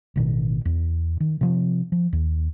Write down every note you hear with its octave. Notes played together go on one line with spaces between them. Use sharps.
A1 B2 D#3
E2
D#3
C3 F3 C4
F3
D#2